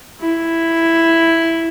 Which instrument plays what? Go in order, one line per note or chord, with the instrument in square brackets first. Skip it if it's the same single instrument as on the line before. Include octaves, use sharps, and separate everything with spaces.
[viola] E4